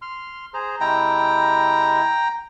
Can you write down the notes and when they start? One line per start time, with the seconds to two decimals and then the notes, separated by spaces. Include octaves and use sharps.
0.02 C6 F6
0.54 G#4 C5 A#5
0.80 C3 G#3 E4 G5 A#5